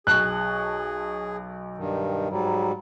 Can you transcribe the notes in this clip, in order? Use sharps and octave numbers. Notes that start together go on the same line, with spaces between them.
B1 G#4 A5 C#6 F#6
G2 D#3
G#2 F#3 G3